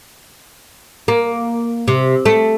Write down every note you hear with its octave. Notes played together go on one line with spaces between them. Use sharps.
A#3
C3
A3